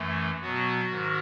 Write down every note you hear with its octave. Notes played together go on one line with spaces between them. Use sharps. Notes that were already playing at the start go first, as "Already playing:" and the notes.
Already playing: F#2 E3 A3
B2 F#3 B3 F#4
G#2 D#3